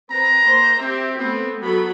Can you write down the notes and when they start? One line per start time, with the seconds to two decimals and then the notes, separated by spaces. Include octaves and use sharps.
0.10 C4 B4 A#5
0.45 A#3 C5
0.80 C4 G4 E5
1.18 A3 B3 C4
1.61 F#3 B3 A4 B5